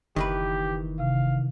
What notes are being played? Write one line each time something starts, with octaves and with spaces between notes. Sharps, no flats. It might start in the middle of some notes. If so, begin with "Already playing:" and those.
F#1 D#3 E3 G4 B4
C3 F5